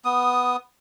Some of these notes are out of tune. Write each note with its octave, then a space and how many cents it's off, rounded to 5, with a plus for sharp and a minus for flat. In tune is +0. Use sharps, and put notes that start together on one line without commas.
B3 +0 D#6 +0